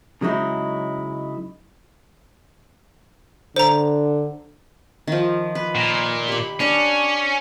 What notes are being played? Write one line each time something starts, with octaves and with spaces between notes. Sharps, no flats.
C#3 F#3 G#3 D#4 E4
D3 C5 A#5
D#3 F3
B4
A#2
G4 B5
C#4 D4 C#6